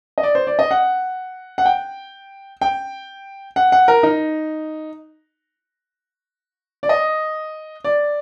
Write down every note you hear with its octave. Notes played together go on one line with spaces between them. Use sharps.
D#5
D5
C5
D5
D#5
F#5
F#5
G5
G5
F#5
F#5
A#4
D#4
D5
D#5
D5